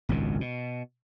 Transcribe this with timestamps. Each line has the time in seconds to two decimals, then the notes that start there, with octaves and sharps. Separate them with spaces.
0.09 G#1 C#2 F#2 B2
0.41 B2